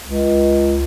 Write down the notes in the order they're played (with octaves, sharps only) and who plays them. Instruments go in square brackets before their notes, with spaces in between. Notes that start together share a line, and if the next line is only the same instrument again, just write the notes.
[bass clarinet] C#2